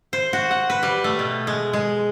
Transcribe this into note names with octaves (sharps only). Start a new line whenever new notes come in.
C5
F#4
F#5
B4
G3
A3
B2
G#3
G#3